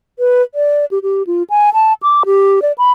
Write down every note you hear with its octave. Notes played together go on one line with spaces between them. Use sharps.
B4
D5
G4
G4
F4
G#5
A5
D6
G4
D5
B5